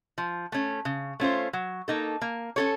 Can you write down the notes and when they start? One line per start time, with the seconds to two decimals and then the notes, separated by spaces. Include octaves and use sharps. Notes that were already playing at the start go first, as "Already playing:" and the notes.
0.18 F3
0.52 A3 C#4
0.85 C#3
1.20 A3 C#4 F4 C5
1.53 F#3
1.88 A#3 D#4 A4
2.21 A#3
2.56 C#4 A4 C#5